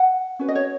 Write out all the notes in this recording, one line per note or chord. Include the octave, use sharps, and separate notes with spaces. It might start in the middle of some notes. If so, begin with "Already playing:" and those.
Already playing: F#5
C#4 F#4 B4
D#5
C#5